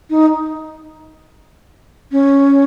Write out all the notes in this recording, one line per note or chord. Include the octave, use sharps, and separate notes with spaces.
D#4
C#4